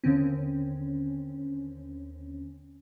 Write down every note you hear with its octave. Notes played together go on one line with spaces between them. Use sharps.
D#2 D3 C4 C#4